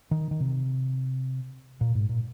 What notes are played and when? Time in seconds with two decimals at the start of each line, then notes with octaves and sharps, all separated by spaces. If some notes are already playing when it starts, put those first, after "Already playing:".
0.11 D#3
0.31 D#3
0.40 C3
1.81 A#2
1.95 G#2
2.09 A#2